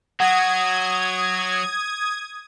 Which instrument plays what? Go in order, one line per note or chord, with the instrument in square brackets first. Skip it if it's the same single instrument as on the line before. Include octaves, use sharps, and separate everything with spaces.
[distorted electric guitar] F#3 [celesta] F#5 [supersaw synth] D#6 G#6